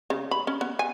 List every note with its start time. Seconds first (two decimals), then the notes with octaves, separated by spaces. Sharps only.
0.10 C#3
0.31 B5
0.47 C#4
0.61 B3
0.79 G#5